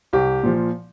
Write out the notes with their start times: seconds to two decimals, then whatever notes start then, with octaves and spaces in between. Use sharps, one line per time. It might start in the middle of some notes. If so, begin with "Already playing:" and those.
0.13 C2 G4
0.44 A#2 F3